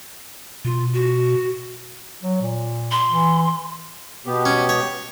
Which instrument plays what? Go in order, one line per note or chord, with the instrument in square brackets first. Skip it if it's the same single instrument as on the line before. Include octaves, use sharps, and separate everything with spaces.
[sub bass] B2 [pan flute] F4
[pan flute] F#4
[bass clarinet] F#3
A#2
[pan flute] C6
[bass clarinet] E3
[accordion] B2 B3 G4
[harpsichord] C#4
C#5